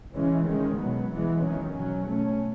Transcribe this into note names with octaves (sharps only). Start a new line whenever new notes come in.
C#3 E3 G#3 C#4
D#3 G#3 C#4
B2 F#3 B3
E3 G#3 B3
D#3 F#3 C#4
B2 F#3 C#4
B2 A3 C#4